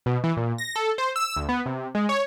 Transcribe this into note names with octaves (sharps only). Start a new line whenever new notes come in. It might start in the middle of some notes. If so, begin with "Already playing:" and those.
B2
E3
A#2
A#6
A4
C5
E6
D2
B3
C3
G#3
C#5